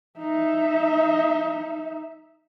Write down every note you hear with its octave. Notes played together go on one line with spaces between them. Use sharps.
D#4 E5